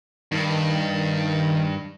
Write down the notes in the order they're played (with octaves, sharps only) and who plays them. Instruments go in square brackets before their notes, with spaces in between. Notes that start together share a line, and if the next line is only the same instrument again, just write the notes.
[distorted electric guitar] G2 [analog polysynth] D#3